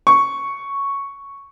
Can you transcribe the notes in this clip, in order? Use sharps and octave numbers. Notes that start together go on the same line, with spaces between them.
C#6